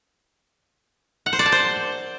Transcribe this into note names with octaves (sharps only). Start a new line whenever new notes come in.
F#5
C5
D5
A5
C5